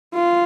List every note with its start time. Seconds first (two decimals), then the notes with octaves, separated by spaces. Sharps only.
0.15 F4